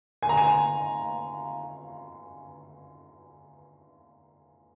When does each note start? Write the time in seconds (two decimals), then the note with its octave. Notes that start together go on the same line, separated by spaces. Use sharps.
0.23 G#5
0.29 A#5
0.38 G#5